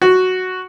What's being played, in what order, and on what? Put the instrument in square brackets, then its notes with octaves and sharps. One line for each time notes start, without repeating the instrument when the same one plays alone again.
[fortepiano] F#4